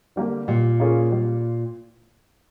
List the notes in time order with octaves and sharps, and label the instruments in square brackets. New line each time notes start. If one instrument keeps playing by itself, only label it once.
[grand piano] D3 G3 A#3
[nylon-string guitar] A#2 [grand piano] G3
[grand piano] A#3 C#4 F4 G#4
G3